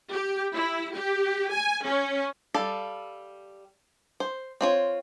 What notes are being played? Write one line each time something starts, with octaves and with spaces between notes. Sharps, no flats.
G4
E4
G4
G#5
C#4
G3 A4 F5
C5
C4 F4 C#5